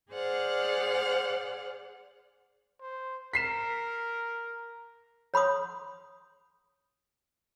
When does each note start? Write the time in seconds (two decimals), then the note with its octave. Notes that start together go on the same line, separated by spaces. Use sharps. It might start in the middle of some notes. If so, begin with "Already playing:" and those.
0.12 G#4 C5 D5 F#5 F6
2.81 C5
3.33 A#4 B6 C7 E7
5.34 C#5 B5 C6 D#6